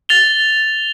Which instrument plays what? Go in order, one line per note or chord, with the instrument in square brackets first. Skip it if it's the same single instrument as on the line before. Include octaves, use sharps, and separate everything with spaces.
[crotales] A6 F7 G7